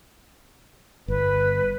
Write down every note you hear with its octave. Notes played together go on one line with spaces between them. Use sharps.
G1 B4